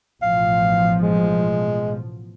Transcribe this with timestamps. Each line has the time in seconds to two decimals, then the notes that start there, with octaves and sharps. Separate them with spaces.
0.22 A1 B2 F3 F5
1.02 G#3